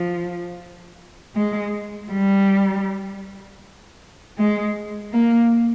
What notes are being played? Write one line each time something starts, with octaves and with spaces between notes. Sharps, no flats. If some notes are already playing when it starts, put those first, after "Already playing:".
Already playing: F3
G#3
G3
G#3
A#3